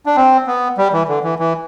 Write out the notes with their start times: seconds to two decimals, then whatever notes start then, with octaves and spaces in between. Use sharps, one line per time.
0.06 D4
0.16 C4
0.47 B3
0.77 G3
0.93 E3
1.08 D3
1.24 E3
1.39 E3